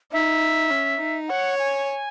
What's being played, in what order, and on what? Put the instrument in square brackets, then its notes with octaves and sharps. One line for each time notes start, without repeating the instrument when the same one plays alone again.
[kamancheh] D#4 [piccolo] E5
[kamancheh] C#4
D#4
[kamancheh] C#5 [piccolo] F#5
[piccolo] G#5